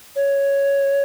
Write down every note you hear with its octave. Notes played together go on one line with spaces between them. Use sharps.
C#5